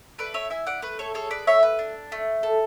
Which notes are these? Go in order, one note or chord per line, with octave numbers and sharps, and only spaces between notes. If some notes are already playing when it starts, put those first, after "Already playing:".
A3 B4 D5
C#5 E5
E4 E5 G#5
D5 F#5
A3 B4
A4 C#5
G#4 A4 C#5
B4 D5
A3 C#5 E5
B4
D4
A3
A4